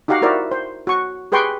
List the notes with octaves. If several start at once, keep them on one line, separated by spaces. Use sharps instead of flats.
D#4 F#4 G4 F5 F#5 A#5
E4 F#4 A#4 C5 D5 E5
C5
F#4 C#6
G4 G#4 B4 G5 C6 C#6